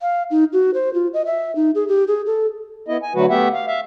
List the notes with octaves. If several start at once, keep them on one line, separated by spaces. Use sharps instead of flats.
F5
D#4
F#4
C5
F4
D#5
E5
D#4
G#4
G4
G#4
A4
B3 E4 D#5
G#5
D3 F#3 A3 F#4 B4
A3 B3 G4 E5 F#5
F5
E5 F5